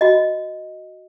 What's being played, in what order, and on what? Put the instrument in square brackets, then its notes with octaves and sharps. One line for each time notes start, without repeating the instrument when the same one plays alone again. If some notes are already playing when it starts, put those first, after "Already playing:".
[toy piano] F#4 D#5